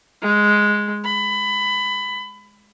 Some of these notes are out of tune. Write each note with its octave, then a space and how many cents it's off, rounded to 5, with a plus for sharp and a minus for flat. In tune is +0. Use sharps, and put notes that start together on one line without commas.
G#3 +0
B5 +20